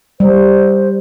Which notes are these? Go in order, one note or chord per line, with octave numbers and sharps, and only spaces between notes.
G3 C5